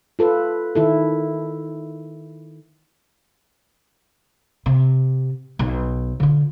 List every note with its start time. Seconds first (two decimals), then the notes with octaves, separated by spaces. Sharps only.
0.19 F4 A4 B4
0.75 D#3 E4 A4
4.66 C3
5.59 B1
6.20 D3 F4